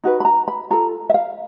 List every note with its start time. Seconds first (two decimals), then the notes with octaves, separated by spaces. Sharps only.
0.04 D#4 F#4 B4
0.20 B5
0.25 A#5
0.48 B5
0.70 F4 A4 A#5
1.10 E5
1.14 F5